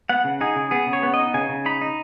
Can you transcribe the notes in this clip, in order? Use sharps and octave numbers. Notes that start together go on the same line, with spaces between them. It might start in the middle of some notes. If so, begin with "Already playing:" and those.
B3 F#5
C#3
D#4 G#4
C#3
B3 G#4
C#3
C#5
B3
D#5
D#4
C#3 G#5
C#3
D#4 B5
D#4